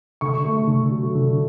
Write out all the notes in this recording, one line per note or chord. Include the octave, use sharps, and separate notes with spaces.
D3 C#6
A3
D3
F#3
D3